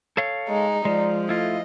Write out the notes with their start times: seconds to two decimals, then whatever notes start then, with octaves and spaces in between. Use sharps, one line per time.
0.17 A4 C#5 F5
0.49 G#3 D#4
0.85 F3 G#3 D5
1.29 A3 E4 F4 D#5